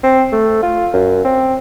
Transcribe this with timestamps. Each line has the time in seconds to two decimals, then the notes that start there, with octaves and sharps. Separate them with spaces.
0.04 C4
0.32 A3
0.63 F4
0.93 F#2
1.25 C4